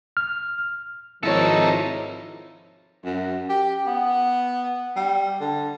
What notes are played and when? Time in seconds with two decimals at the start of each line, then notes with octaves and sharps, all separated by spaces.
0.17 F6
1.23 G#1 F3 D#4 E4 A4 C#5
3.05 F#2
3.49 G4
3.86 B3
4.96 G3
5.40 D3